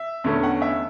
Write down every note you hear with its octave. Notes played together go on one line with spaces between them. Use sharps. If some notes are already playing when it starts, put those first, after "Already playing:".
Already playing: E5
E2 D3 A3 C#4
F#5
E5